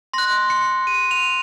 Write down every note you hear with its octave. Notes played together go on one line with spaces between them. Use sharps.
C6 F#6 A#6
C#7
D#7
F7